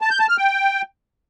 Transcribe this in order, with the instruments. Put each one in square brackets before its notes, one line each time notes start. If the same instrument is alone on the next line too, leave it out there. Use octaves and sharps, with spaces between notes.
[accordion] A5
G6
A5
F6
G5